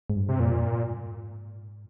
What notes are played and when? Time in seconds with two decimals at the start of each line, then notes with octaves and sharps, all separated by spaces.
0.10 G#2
0.16 G2
0.28 C3
0.39 F2 A#2
0.64 G2
0.87 G#2